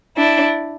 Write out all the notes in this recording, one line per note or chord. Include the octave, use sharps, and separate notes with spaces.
D4 E4